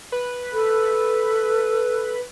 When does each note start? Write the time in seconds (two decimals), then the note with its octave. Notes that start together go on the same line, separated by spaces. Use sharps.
0.12 B4
0.52 A4